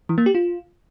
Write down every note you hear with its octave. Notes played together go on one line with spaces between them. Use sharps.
E3
A#3
G4
F4